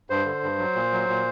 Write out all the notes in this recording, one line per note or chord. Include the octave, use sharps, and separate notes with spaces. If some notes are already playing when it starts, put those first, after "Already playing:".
G2 C5
D3
G2
F#3
A#2
F#3
A#2